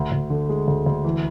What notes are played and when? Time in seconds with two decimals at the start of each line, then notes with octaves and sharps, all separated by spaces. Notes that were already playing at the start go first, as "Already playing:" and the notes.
Already playing: D2
0.12 D2
0.30 D3
0.49 G#3
0.68 D2
0.86 D2
1.04 E3